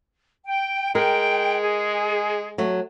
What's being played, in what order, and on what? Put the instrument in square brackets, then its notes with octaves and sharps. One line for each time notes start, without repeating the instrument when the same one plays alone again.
[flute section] G5
[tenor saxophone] G#3 [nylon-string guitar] A#4 [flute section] G5
[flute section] G#4
[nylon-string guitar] F#3 A3